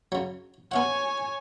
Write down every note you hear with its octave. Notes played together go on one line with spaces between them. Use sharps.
C#3 F#3
B3 C#5 F5 F#5 G#5